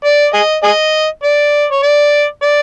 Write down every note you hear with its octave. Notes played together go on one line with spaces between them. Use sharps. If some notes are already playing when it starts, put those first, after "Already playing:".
D5
G#4 D#5
G#4 D#5
D5
C#5
D5
D5